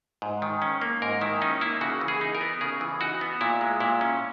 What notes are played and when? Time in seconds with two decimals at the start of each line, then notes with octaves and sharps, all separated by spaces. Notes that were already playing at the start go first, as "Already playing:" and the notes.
0.22 G#2
0.42 D#3
0.62 C#4
0.81 A#3
1.02 G#2 A#4
1.21 D#3 E4
1.42 C#4 D#4
1.61 A#3 E4
1.81 C#3 F#4
2.01 E3
2.08 G#4
2.21 D#4
2.35 A#4
2.41 B3
2.61 C#3 G#4
2.81 E3
3.01 D#4 F#4
3.21 B3
3.41 A#2 E4
3.61 G#3
3.80 A#2 E4
4.01 C#4